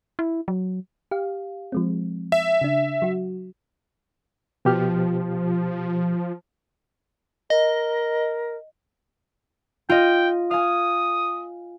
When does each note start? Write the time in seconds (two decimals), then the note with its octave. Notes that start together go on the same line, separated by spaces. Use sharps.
0.19 E4
0.48 F#3
1.11 G4 F5
1.72 F3 G#3 C4
2.32 E5
2.61 C#3 D4
3.02 F#3 F#4
4.65 B2 F3 G4 F6
7.50 A#4 D#5
9.89 F4 D#5 G5
10.51 F5 G#5 D#6